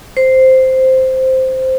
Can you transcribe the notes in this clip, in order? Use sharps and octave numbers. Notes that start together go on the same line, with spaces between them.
C5